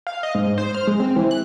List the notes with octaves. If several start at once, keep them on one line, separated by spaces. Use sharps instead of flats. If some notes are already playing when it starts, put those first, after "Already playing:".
F5
D#5
G#2
C5
F6
G#3
C4
E3
F#6